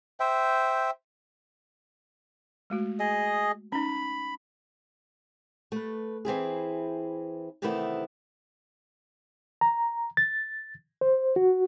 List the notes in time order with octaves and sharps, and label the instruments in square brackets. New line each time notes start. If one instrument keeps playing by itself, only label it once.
[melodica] C5 E5 G5
[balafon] G#3 A3 F#4
[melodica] G#4 D#5
[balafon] C#4 D#4 [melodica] B5
[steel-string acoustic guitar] A3 B4
E3 C4 E4 G#4
C3 D#3 E3 A3 B3 E4
[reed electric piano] A#5
A6
C5
F#4